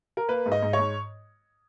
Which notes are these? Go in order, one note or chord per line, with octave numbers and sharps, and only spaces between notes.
A#4
A#3 B4
G#2
D#5
G#2
C#5
G#2